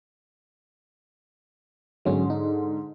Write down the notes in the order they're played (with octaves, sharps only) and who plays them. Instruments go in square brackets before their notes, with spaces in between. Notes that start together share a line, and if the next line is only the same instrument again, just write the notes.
[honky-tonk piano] G#2 D3 [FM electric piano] F#3 C#4
[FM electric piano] D#4